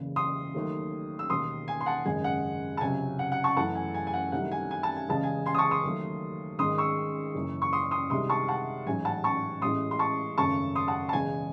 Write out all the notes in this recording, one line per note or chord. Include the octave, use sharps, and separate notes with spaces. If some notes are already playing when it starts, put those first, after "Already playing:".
Already playing: F#1 E2 C#3
C6 D#6
D#2 D#3 F#3 A3
E6
E1 D#2 D#3 C6 D#6
G#5
C6
F#5 A5
G#1 F#2 C#3 G#3 G#5
F#5
A5
C#2 C3 F#3 G#5
F#5
F#5
A5 C#6
F#2 E3 A3 F#5 A5
G#5
G#5
G#5
F#5
C2 C3 D#3 F#3 A3 F#5
G#5
G#5
A5
G#5
E2 C#3 G#3 A5
G#5
G#5 C6
D#6
A5 C#6
C6 D#6
D#2 D#3 F#3 A3
G#1 G#2 D#3 G#3 C6 D#6
C#6 E6
F#1 F#2 E3
C#6
C6 D#6
C6 D#6
C2 C3 D#3 G#3 C6 D#6
A5 C#6
F#5 A5
A1 G#2 F#3 G#5
F#5 A5
A5 C#6
A1 A2 G#3 C6 D#6
C6
A5 C#6
G#1 F#2 C#3 F#3 A3 A5 C#6
C6 D#6
F#5 A5
A5
E1 E2 C#3 G#3 G#5